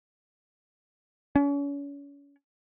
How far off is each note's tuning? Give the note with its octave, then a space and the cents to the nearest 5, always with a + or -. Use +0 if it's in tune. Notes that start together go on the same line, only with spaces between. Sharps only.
C#4 +35